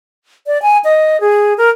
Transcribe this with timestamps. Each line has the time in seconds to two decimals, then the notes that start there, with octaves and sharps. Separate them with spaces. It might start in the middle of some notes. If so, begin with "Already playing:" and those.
0.47 D5
0.62 G#5
0.84 D#5
1.21 G#4
1.58 A#4